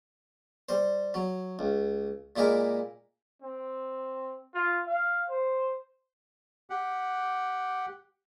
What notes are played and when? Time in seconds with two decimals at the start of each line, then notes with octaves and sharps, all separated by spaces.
0.69 G3 C5
1.14 F#3
1.59 C#2
2.36 A#2 G#3 E4 G4 A#4
3.42 C4
4.54 F4
4.87 F5
5.29 C5
6.70 G4 F#5